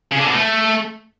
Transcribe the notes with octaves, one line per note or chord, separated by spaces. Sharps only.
C#3
D3
B2
A3